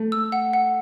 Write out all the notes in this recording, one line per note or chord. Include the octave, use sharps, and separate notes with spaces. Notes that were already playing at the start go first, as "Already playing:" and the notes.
Already playing: A3
E6
F#5
F#5